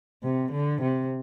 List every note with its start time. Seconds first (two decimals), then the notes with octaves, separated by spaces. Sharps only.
0.24 C3
0.52 D3
0.81 C3